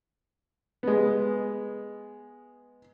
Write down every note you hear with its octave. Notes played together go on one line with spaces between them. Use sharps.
G#3 B3